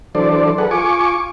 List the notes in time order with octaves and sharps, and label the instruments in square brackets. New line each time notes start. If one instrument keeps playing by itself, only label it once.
[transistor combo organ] E3 F#3 D4 A4 C5 D5
G#4 A4 B4 F#5
F4 G#5 C#6 D6